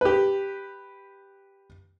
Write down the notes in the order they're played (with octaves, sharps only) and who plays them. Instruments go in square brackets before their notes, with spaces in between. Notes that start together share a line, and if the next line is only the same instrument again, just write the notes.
[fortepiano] G4 B4